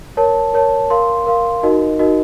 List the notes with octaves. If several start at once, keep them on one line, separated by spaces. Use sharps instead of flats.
A#4 C#5 A5
A#4 C#5 A5
A#4 F5 C6
A#4 F5 C6
D#4 F#4 A#4 D#5
D#4 F#4 A#4 D#5